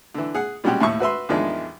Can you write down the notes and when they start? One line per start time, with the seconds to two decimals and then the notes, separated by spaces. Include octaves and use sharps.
0.14 D3 E3
0.34 G#4 F#5
0.64 A#2 G3 G#3 C#4 F#4 G4
0.80 D#2 A2 E4 C#6
1.00 F#4 B4 E5 C6
1.29 A1 E2 D#3 F3 G#3 D4